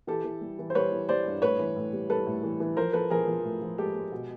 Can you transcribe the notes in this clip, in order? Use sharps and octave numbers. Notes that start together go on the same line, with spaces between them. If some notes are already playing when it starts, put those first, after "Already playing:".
E3 G4 A4
E3
G3
E3
C5
G3 B4 C#5
E3
G3 C5 D5
G2
A2 B4 C#5
E3
A2
G3
G3 A4 B4
A2
E3
E3
F3 A#4 C5
F3 A4 B4
F3 G#4 A#4
F3
A2
F3
G#3 G4 A4
G#3
B2